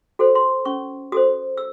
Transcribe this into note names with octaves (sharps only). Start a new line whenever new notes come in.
F#4 A4 C5
C6
C#4 C#6
F#4 A4 C5 D#6
E6